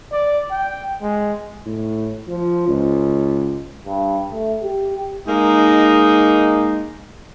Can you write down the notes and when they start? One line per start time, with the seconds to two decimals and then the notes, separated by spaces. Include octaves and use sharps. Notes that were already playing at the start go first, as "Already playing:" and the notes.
0.12 D5
0.50 G5
1.02 G#3
1.66 A2
2.28 F3
2.68 C#2
3.86 G2
4.32 A3
4.63 G4
5.27 G#3 A#3 D#4